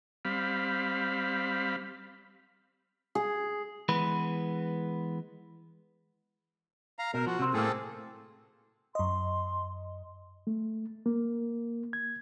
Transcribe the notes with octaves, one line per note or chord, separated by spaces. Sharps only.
G3 C4 F5 B5
G#4
E3 G#3 B3 B4
F5 A#5
B2 A#4
F3 F#4
C3 C4
A2 A3 A#3 C4 G#4 A4
F#2 D#5 C6
A3
A#3
G#6